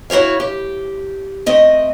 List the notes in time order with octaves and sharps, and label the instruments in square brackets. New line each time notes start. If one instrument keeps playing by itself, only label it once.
[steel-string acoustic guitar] E4 F#4 G4 C#5 F5
G4
A3 C4 D#5 E5